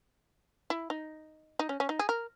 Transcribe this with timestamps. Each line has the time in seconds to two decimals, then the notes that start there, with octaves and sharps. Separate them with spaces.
0.70 E4
0.90 D#4
1.59 D#4
1.69 C#4
1.80 C#4
1.89 D#4
1.99 G#4
2.09 A#4